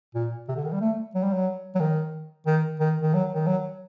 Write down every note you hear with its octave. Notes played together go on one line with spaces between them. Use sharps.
A#2
C3
D3
D#3
G3
A3
F#3
G3
F#3
F#3
D#3
D#3
D#3
D#3
F#3
D#3
F#3